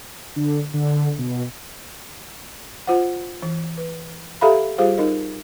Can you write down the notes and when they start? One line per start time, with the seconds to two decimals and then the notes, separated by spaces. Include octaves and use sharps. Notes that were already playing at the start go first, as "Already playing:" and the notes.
0.36 D3
0.74 D3
1.19 B2
2.87 F4 C5 F#5
3.42 E3
3.77 B4
4.41 G4 A4 E5 F5 A#5 B5
4.78 G3 F4 G4 G#4 C5 F5
4.98 D#4 A#4 D#5